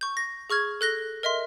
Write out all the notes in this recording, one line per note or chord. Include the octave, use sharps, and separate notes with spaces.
C#6 G6
A#6
G#4 C#6 F6 G#6
A4 F#6 A#6 G7
A#4 D#5 E5 C6